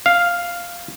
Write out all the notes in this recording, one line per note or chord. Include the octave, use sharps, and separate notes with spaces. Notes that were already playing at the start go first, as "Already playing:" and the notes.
F5